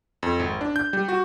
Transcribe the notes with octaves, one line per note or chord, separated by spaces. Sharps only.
F2
G#1
D4
G6
G3
F#4